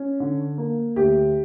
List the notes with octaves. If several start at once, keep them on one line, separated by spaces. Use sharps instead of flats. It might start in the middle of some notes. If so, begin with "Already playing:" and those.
Already playing: C#4
D3
A#3
D2 G4